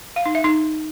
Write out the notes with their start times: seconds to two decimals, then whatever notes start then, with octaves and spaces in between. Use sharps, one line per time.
0.16 F5
0.26 D#4
0.35 E5
0.44 D#4